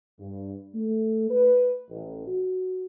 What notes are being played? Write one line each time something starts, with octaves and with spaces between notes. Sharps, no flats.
G2
A3
B4
A1
F#4